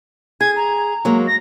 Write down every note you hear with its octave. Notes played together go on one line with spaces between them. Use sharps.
G#4 G#6
A#5
F#3 G#3 A#3
A#6